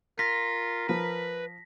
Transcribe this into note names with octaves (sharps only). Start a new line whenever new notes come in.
F4 A#4 A#6 B6
F3 B4